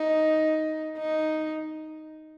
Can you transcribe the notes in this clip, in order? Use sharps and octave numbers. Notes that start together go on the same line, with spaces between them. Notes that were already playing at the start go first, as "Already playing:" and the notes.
Already playing: D#4
D#4